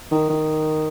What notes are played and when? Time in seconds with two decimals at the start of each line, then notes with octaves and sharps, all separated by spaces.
0.11 D#3
0.30 D#3